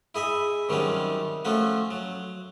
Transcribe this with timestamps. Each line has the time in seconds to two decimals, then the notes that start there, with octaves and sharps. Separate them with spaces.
0.15 E4 G#4 D#5 E5
0.69 C3 D#3 F#3 G3 C#4
1.45 F3 A3 C#4 F#4
1.91 F#3